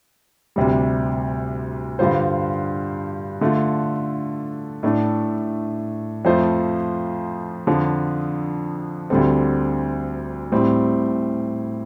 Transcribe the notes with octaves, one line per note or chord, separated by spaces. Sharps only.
D2 C3 G3
G2 D3 G3 F4 C5
D3 A3 F4
A2 A3 D4
F2 F3 A3 F4 C5
F2 D3 F3
D2 D3 G3 C4 A4
A2 G3 C4